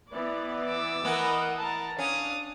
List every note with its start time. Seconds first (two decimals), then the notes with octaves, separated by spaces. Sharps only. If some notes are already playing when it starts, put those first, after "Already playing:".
0.12 E3 B3 D5
0.66 D6 E6
1.05 E3 B3 E4 A#4 D#5 F#5
1.61 A#4 A5
1.99 C#4 D4 F5 D#6